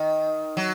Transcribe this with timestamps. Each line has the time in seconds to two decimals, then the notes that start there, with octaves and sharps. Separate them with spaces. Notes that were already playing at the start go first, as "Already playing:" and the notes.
Already playing: D#3
0.57 F#3